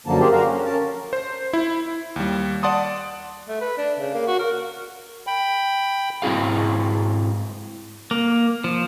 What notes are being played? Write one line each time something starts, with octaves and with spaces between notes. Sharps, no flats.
F#2 D3 F3 A#3 A5
A#3 G4 G#4 A#4 C5
D3 F#4 A#4 F5 A#5
C#4
C#4 A#4 A5
C5
E4
D#2 G3
D5 F#5 A5 C6 D#6
A3
B4
D4
C#3
A#3
F#4
A#4
G5 B5
G#2 C4 E4 G#4 F5
A#3
F3